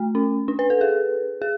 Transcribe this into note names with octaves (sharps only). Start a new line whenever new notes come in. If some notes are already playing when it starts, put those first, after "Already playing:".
Already playing: A3
C#4
D4
B4
A4
G#4
G#4